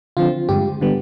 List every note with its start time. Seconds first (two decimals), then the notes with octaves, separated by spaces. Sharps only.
0.17 D3 F3 C4 F4
0.49 G2 D3 G#3 G4
0.81 D3 G3 B3